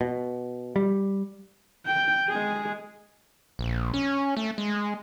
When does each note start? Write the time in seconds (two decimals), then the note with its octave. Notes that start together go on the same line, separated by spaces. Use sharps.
0.01 B2
0.76 G3
1.86 G5
2.29 G#3 G#4
3.59 A#1
3.94 C#4
4.37 A3
4.58 G#3